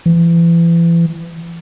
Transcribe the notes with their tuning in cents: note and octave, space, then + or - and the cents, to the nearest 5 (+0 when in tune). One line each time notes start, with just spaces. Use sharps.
E3 +35